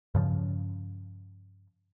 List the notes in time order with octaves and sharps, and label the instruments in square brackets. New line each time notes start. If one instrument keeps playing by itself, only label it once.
[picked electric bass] G2 C#3 F3